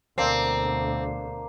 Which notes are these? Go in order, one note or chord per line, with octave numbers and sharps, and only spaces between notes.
D2 B2 A#3 C4 D4